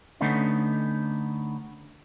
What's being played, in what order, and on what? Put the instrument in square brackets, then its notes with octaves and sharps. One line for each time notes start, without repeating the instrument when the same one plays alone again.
[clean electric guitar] D3 A3 B3 C#4 D#4